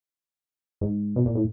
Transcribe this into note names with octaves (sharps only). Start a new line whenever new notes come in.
G#2
B2
A#2
A2